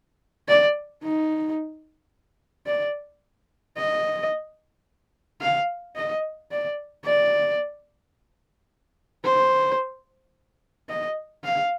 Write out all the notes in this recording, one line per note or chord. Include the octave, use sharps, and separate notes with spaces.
D5
D#4
D5
D#5
F5
D#5
D5
D5
C5
D#5
F5